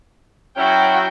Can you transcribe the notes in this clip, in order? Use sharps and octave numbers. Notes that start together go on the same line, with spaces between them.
F#3 C#4 E4 F#4 G5